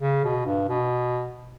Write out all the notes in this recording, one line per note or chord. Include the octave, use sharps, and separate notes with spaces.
C#3
B2
G2
B2